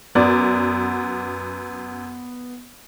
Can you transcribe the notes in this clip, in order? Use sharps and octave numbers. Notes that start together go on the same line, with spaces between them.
F#2 B3 D5